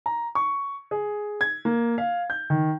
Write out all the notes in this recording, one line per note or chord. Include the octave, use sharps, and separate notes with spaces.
A#5
C#6
G#4
G#6
A#3
F5
G6
D#3